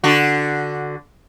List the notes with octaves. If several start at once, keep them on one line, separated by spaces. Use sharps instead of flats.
D3 F#4